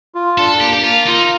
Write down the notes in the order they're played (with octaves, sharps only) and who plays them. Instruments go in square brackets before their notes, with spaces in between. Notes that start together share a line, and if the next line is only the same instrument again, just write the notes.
[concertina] F4
[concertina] D4 [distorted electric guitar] A4
[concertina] A#3 [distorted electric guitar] G4
[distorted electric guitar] G4
[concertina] A#3 [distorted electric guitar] F4
[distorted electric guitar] D#4 [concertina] F4